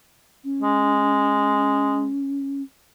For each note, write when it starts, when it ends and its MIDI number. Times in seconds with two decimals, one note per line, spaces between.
0.44 2.62 61
0.62 2.12 56